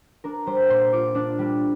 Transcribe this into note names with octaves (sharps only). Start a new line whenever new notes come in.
D4 A#4
G3 C5
A#2 C6
F4 D6
D4
G3